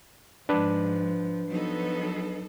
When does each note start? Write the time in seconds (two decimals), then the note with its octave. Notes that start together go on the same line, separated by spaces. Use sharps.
0.49 G#2 F3 D4 B4
1.50 F3 F#3 B3 D#4 A4